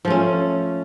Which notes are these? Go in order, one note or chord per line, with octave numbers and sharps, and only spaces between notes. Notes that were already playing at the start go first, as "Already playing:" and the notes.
F3 A3 C#4